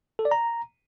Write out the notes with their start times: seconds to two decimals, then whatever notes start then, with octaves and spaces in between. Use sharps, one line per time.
0.19 A4
0.25 D5
0.31 A#5